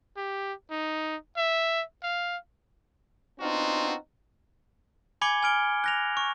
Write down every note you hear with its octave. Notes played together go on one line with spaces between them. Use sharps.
G4
D#4
E5
F5
B3 C4 D4 D#4 F4 F#4
G#5 B5 D6 G#6 C#7 G7
G#5 F6 D7 G7
F#6 A#6 F7
C#6